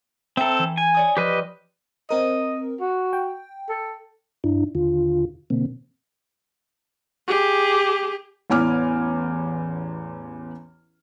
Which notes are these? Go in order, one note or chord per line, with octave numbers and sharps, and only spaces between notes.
C4 A4 E5 G5 A#5
E3
G#5 G#6
C#5 D5 D#6
F3 G4 B4 D#5
C4 A#4 D#5
F#4
G5
A4
G2 D4 E4
D#2 D3 F4
B2 D3 A#3 C4
G4 G#4
A1 E2 G#5 D6 F6